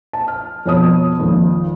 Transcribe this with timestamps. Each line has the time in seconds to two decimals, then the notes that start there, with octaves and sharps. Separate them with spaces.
0.13 A5
0.28 F6
0.66 F2 B2 C#5 A5 D#6
1.19 G#1 F2 A#2